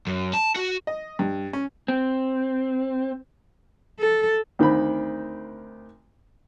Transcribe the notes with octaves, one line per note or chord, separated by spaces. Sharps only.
F#2
A5
F#4
D#5
G2
C#4
C4
A4
D2 D#3 C4 B5